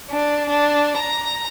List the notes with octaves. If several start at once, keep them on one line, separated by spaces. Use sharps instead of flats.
D4
D4
A#5